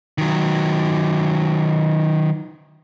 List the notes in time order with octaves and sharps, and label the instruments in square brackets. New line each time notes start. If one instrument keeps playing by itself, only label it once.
[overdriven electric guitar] D#3 F#3